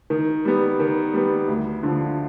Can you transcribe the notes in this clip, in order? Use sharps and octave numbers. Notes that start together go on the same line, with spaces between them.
D#3
G3 B3
D#3
G3 B3
D2
D3 F3